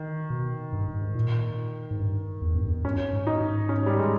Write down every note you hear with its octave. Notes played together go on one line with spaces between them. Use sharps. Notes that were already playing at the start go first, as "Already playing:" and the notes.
Already playing: D#3
B2
G2
G2
G#2
A#2
G#2
G2
E2
G2
E2
G2 C#4
G#2
D#4
G#2
C#4
G3
G#3